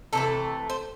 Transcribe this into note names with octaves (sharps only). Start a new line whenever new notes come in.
C3 E3 A3 A4
C5